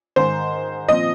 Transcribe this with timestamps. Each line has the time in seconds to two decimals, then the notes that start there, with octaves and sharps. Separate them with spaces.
0.16 G#2 D#3 G#3 C5
0.88 A#2 F3 C4 D#5